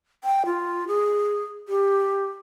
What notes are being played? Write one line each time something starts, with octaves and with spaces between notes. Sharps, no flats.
G5
F4
G#4
G4